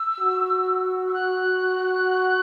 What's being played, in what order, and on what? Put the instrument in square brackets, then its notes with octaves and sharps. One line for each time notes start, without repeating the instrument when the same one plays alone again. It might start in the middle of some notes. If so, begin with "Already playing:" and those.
Already playing: [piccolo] E6
[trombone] F#4
[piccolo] E6
F#6